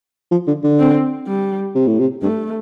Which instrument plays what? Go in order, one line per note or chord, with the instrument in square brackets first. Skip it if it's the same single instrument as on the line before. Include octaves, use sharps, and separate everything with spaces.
[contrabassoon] F3
D3
D3
[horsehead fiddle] C4
G3
[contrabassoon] C3
A2
C3
[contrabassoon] G2 [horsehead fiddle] A3